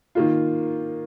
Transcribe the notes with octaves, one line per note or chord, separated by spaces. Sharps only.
D#3 A#3 F4